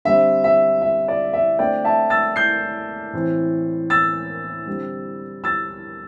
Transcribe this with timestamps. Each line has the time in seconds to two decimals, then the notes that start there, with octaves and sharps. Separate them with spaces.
0.05 D3 G3 C4 E5
0.44 E5
0.82 E5
1.08 D5
1.33 E5
1.59 D3 A3 C4 D5 G5
1.84 E5 A5
2.10 E6 A6
2.36 G6 C7
3.13 A2 E3 C4
3.90 E6 A6
4.67 D3 G3 C4
5.44 E6 A6